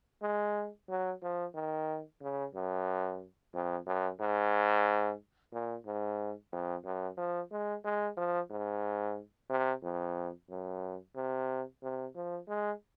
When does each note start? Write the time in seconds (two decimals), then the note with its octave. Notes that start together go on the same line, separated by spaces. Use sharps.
0.22 G#3
0.89 F#3
1.23 F3
1.55 D#3
2.22 C#3
2.55 F#2
3.54 F2
3.87 F#2
4.20 G#2
5.53 A#2
5.86 G#2
6.53 F2
6.85 F#2
7.18 F3
7.52 G#3
7.85 G#3
8.17 F3
8.50 G#2
9.50 C3
9.83 F2
10.50 F#2
11.16 C3
11.82 C3
12.15 F3
12.48 G#3